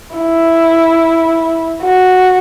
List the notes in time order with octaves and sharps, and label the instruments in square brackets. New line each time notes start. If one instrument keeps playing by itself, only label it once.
[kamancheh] E4
F#4